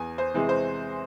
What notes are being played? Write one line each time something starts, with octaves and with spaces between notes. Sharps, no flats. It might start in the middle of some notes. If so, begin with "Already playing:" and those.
Already playing: E2 G#5
C5
C3 E3 G#3
C5